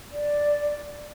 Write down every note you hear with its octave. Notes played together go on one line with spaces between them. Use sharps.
D5